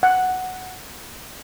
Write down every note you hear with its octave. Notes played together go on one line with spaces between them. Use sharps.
F#5